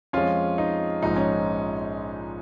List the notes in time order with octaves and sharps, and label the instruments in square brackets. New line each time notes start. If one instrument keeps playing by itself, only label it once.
[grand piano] F2 F3 G#3 C#4 F4
D#4
A#1 G#2 F3 G#3 D#4
C#4